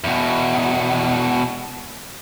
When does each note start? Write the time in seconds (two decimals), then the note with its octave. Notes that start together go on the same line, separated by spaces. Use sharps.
0.04 E2 B2